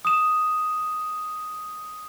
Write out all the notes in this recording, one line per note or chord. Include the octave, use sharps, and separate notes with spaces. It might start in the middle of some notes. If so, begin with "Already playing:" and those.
D#6 E7